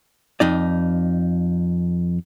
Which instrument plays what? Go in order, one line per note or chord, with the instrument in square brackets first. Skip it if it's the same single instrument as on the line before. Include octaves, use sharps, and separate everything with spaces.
[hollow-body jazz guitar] F2 D#4 D5